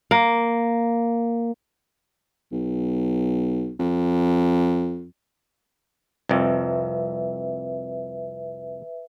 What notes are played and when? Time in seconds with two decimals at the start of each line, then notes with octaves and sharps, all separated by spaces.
0.11 A#3
2.52 B1
3.79 F2
6.29 C2 F2 B4 E5